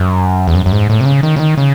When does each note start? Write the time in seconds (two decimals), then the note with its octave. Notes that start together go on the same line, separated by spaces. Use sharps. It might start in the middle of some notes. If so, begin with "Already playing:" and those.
Already playing: F#2
0.47 E2
0.55 F#2
0.66 F#2
0.72 G#2
0.90 A2
1.01 C3
1.05 C#3
1.23 D#3
1.36 C#3
1.39 D#3
1.58 C#3